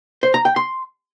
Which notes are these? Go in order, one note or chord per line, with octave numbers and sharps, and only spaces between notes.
C5
A#5
G5
C6